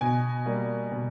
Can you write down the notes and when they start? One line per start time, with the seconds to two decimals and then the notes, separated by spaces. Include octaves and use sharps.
0.01 B2 G#5
0.46 G3 A#3
0.91 B2